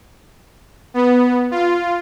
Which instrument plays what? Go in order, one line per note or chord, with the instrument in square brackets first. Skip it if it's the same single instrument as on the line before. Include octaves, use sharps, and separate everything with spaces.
[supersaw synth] B3
F4